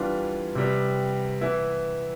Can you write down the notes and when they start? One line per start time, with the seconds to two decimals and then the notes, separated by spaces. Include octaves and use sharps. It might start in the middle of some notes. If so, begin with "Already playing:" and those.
Already playing: E3 G3 B3 D4 F4
0.55 C3 G3 B3
1.41 E3 B3 E4